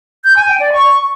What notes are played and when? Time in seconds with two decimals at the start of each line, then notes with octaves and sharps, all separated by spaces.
0.24 G6
0.36 G#5
0.48 G5
0.60 D5
0.71 C#6